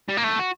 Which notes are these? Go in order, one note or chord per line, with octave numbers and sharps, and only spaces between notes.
G3
A#3
A3
F#4